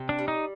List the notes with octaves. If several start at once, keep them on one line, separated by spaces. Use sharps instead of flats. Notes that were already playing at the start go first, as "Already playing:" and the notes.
Already playing: C3
D4
G3
D#4